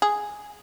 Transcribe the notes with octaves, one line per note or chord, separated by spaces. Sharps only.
G#4